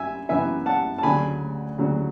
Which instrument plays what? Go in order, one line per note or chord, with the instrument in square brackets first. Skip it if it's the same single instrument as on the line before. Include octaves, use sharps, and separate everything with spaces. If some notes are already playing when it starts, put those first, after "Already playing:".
Already playing: [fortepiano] F#2 E5 G#5
F#2 E3 B3 E5 G#5
F#5 A5
A5
D2 C#3 F#3 G#5 B5
D2 C#3 F#3